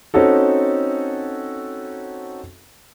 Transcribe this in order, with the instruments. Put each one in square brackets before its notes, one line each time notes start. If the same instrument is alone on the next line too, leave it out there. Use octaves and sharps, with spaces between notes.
[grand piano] C4 C#4 D#4 F#4 A4